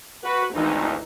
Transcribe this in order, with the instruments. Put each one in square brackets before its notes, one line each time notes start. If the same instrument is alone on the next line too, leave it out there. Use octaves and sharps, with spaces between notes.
[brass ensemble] F#4 [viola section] B4
[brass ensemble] G#1 D2 [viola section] E3 D#4